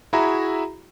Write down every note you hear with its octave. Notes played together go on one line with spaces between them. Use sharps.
E4 F#4 G#4 E5 A#5 B5